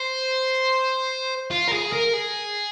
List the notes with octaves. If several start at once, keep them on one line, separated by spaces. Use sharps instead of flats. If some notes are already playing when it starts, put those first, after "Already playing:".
Already playing: C5
F4
A#4
G#4
A#4
G#4